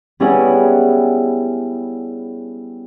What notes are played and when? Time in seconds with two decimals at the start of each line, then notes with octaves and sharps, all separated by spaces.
0.20 G3 B3 C#4 E4 G#4 F#5